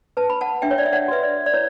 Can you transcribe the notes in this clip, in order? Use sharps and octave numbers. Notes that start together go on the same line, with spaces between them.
B4 A5
B5
F#5 A5
D4 E5 G5
C#5
D5
E5
D5 F#5
F#4 B4 E5
D5
D5
E4 C#5